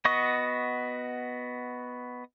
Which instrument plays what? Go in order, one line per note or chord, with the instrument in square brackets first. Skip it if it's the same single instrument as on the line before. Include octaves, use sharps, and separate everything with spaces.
[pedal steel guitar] B3 F#4 D#5 C#6 D#6